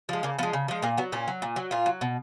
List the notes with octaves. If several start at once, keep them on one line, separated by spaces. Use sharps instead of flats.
F3 G#3
C#3 A#3
F3 G#3 B3
C#3
F3 G#3
A#2 A#3
F#3 B3
A#2 C#4
F#3
A#2
F#3
A#2 F4
F#3
B2